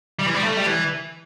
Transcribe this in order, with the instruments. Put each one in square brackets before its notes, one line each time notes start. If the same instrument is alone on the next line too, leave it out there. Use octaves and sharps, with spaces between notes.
[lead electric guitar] G3
E3
G3
A3
G3
E3